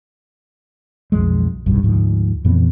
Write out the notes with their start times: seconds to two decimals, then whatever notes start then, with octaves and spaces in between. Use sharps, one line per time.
1.12 B1 F2 F3 G#3
1.66 F1 B1 G2
1.83 D2 G#2 F3
2.45 F2 A#2 E3 B3